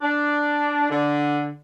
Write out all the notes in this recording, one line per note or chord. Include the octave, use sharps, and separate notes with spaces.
D4
D3